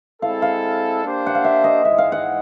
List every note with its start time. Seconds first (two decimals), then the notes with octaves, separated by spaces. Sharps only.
0.22 G#3 C4 E4 A4 F5
0.42 F5
1.04 A#3 D4 G4 C5
1.27 F#5
1.35 F5
1.44 E5
1.64 D#5
1.84 G#2 E3 G#3 E5
1.98 F5
2.12 F#5